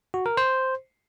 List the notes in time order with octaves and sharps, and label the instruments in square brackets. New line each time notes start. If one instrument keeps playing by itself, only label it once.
[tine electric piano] F#4
A#4
C5